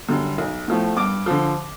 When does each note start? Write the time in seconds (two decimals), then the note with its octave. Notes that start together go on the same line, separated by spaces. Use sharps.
0.09 F#2 D3 G3
0.38 B1
0.68 A2 F3 A3
0.97 G2 D6
1.26 D3 F3